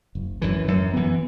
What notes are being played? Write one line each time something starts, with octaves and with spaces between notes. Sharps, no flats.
F#1
F#2 E3
F#2
E3 B3